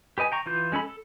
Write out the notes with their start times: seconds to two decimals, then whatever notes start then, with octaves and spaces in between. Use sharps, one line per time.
0.18 G4 B4 D#5 G#5
0.32 G5 A#5 C#6
0.46 E3 F4 G6
0.72 G#3 C#4 A4 B5
0.84 A4